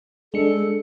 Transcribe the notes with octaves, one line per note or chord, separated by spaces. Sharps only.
G#3 D4 A4 C#7